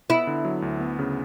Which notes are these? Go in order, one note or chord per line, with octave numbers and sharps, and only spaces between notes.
B3 E4
D3
F#3
D2
B3
C#3